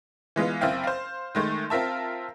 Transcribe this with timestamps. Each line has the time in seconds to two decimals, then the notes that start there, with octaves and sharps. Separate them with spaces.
0.36 E3 G#3 B3 F4
0.61 F#1 C4 E4 F5 G5
0.84 C5 F5
1.35 D#3 G#3 A3
1.70 C4 F4 A#4 E5 A5